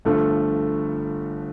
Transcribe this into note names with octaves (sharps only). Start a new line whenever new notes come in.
G1 G2 F3 A3 A4